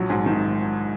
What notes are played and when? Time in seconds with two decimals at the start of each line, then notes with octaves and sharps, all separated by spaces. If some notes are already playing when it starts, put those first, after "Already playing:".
Already playing: A#1 F#3
0.10 G#2
0.26 D#3